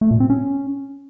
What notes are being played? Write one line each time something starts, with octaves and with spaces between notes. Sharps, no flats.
A3
A#2
C4
C#4